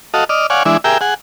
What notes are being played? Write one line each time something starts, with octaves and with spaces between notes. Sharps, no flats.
F#4 A4 D#5 F5
D5 D#5 F6
C#5 D5 F5 F#5 G#5
E3 G#3 D4 E4
G4 G#4 A#4 E5 G5
G#4 F#5